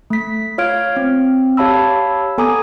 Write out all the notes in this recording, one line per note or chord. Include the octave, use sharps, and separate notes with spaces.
A3 B6
F4 C#5 F5 F6 G#6 D7
C4
G4 C#5 F5 A5 B5 E6
B3 A4 G#5 A#5 D6 D#6